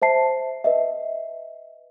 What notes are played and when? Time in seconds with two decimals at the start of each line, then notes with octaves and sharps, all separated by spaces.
0.02 C5 E5 A5 C7
0.64 B4 D#5 E5